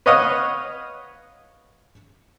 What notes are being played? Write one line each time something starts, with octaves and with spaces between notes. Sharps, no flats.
B4 C#5 D#5 F5 F#5 D#6